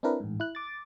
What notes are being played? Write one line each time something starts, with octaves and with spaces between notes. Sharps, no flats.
C4 D4 E4 A#4 B4
A1 G#2
E4 F#6
D6 A6